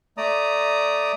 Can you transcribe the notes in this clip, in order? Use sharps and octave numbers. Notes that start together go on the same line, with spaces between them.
A3 D5 A#5 D#6